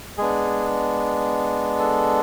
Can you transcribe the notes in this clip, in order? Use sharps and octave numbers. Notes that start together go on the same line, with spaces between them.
G#3 B3 D4 G#4
A4